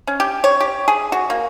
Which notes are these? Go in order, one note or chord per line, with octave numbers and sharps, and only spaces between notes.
C#4
G4
C#5
G4
G#4
F#4
A#3